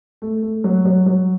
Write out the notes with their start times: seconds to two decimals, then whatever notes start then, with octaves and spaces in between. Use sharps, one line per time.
0.22 A3
0.42 A3
0.64 F#3
0.85 F#3
1.06 F#3